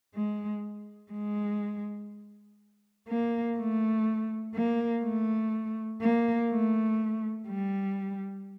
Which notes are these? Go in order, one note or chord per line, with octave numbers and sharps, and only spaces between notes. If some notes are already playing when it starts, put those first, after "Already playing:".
G#3
G#3
A#3
A3
A#3
A3
A#3
A3
G3